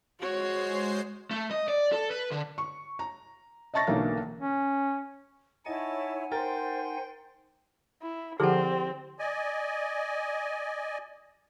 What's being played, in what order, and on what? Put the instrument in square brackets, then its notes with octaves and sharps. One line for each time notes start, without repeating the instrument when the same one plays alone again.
[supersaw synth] G#3 C5 C7 [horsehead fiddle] F#4 C#5
[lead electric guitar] A3
D#5
D5
A4
B4
D3
[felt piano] C#6
A#5
D#5 E5 A5 C#6 A6 A#6
B1 D3 E3 A#3 F5 A#5
[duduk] C#4
[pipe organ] D#4 F#5 G#5 [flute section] E4 C#5 [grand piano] D#5 [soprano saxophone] A5
[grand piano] A#4 A6 [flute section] C5 [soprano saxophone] G5
[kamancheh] E4
[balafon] D3 F3 F#5 [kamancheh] C4 [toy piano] E4 G4 G#4
[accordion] D5 D#5 G#5